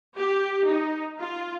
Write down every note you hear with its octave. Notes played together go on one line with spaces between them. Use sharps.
G4
D#4
F4